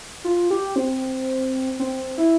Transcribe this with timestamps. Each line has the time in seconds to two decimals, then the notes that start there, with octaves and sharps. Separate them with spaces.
0.24 F4
0.50 G4
0.76 C4
1.79 C4
2.18 E4